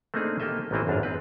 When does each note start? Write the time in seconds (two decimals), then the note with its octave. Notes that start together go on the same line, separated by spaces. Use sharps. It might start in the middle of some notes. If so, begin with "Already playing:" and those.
0.14 A3 A#3 C4 D4 D#4 G#4
0.40 A#3 G4 A4 D#5 E5
0.71 A1 D#3 E3 C4 E4 D#5
0.87 G#1 F#2 D4 D5 F5
1.03 C4 B4